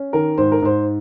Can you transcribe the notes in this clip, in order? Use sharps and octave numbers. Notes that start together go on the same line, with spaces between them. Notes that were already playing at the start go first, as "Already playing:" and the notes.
Already playing: C#4
D#3 A#4
G#2 C5
A#4
G#2 C5